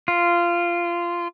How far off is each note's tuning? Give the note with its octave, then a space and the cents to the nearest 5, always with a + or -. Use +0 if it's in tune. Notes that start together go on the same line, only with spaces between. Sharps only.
F4 -15